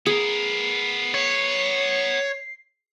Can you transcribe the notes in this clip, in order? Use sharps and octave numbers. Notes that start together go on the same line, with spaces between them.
B3 G#4 A#4 C7
C#5